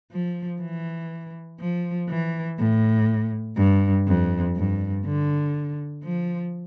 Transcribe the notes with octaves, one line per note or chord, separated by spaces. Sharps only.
F3
E3
F3
E3
A2
G2
F2
G2
D3
F3